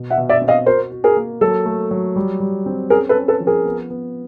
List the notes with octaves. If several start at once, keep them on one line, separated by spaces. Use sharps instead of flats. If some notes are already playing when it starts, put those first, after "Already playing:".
Already playing: B2
E5 F#5
B2
D5 E5
C4
D#5 F5
F#4 A#4 C5
F#4
G#4 A#4
A#3
F#3 A4
A3
F#3
G3
G3
C4
C#4 G#4 A#4
A4 B4
C#4
A4 B4
F3
G#4 A#4
B3
B3